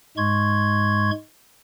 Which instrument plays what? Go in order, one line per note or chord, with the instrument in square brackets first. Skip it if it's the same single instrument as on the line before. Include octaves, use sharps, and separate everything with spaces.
[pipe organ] G#2 G#3 C6 C#6 G#6